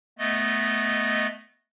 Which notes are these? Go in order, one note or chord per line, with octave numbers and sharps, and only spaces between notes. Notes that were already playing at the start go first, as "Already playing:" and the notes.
A3 B3 D#5